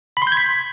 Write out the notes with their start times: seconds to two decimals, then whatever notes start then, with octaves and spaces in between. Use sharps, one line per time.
0.17 B5
0.22 C6
0.27 G6
0.32 G#6
0.37 B6